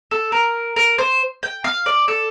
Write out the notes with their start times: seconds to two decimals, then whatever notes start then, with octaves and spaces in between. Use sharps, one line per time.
0.11 A4
0.32 A#4
0.76 A#4
0.98 C5
1.43 G5
1.64 F5
1.86 D5
2.08 A4